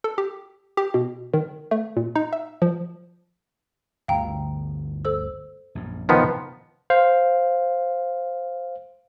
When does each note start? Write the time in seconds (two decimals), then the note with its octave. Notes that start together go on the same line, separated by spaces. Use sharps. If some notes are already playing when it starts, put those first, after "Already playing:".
0.04 A4
0.18 G4
0.77 G4
0.94 B2
1.34 D#3
1.71 A3
1.97 A#2
2.16 D#4
2.33 E5
2.62 F3
4.08 G1 D2 F5 G5 A#5
5.05 A4 C5 E6
5.75 A#1 F#2
6.09 F1 D#2 A2 D#3 F3 B3
6.90 C5 F5